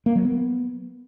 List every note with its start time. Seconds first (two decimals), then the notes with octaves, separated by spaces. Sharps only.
0.06 A#3
0.15 F#3
0.25 B3